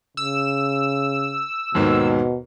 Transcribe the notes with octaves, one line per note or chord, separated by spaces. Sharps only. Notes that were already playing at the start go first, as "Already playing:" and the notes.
C#3 E6
D#2 G#2 B2 D#3